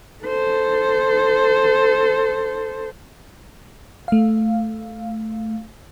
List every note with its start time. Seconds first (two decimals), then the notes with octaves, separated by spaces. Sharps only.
0.24 A4 C5
4.08 A3 F5